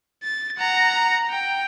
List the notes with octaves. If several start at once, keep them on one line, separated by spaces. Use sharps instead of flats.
A6
F#5 A#5
G5